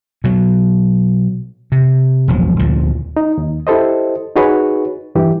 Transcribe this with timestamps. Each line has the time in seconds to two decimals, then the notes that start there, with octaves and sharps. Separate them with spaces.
0.24 B2 F#3
1.72 C3
2.28 E1 A#1 F3 F#3
2.59 D2 A#2 F3
3.17 D#4
3.38 D#2
3.67 E4 G4 A4 C5 D#5
4.36 D#4 F#4 G#4 B4 C#5
5.15 G2 E3 G4